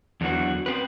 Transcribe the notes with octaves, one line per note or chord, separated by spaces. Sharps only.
E2 D3 E3 F#3 F#4
C4 B4